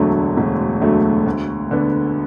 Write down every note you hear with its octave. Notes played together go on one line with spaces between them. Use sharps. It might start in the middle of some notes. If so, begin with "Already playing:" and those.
Already playing: E1 D2 D3 F#3 A3
E1
D2 D3 F#3 A3
D2
D3 B3